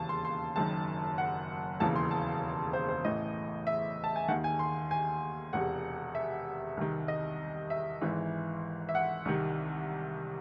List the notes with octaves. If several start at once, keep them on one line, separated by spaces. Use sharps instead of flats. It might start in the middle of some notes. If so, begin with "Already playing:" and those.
Already playing: E1 D#2 C#3 E3 A5
C6
C6
F#1 F#2 D#3 A5
F#5
E1 D#2 C#3 E3 A5
C6
A5
C5
C5
A1 A2 E3 D#5
E5
A5
G#5
D#2 D#3 F#5
G#5
C6
G#5
E1 E2 C3 F#5
E5
C2 C3 D#3
D#5
E5
G#1 G#2 E3
E5
F#5
C2 C3 D#3